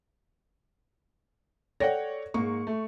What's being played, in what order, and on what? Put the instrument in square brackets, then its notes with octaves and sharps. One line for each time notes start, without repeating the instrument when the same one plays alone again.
[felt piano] A4 C#5 D5 [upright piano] F#5 G5 A#6
[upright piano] G#2 A#3 [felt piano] C#6
[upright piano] A3